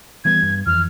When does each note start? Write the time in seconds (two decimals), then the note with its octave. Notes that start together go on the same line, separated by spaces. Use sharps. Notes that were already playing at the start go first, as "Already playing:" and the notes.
0.25 E3 G3 B3 G#6
0.42 G2
0.66 F2 E3 F6